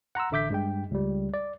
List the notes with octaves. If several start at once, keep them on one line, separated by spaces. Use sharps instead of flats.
F#5 A#5 C6 E6
A1 D3 E5 D6 G6 B6
G2 G#3 G5
C#2 G3
D5